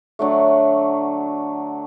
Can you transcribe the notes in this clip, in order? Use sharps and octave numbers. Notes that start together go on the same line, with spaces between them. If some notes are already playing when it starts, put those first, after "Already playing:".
D3 F#3 A3